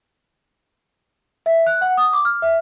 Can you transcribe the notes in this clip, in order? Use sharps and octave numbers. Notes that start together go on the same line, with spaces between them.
E5
F#6
F#5
D#6
D6
F6
E5